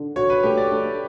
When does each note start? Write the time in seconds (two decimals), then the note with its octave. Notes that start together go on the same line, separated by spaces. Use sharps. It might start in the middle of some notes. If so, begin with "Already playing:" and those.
Already playing: D3
0.16 F#4 C#5
0.30 B4
0.43 A3 G4
0.58 D5
0.72 A3